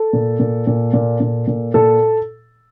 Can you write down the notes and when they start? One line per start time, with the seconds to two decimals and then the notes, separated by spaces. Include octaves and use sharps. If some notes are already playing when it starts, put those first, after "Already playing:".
Already playing: A4
0.13 A#2
0.40 A#2
0.67 A#2
0.93 A#2
1.20 A#2
1.47 A#2
1.74 A#2 A4